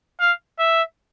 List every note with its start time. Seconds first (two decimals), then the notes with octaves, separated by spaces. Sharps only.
0.20 F5
0.59 E5